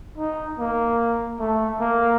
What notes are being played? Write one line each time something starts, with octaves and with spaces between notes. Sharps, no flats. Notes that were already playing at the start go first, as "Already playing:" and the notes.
D#4
A#3
A3
A#3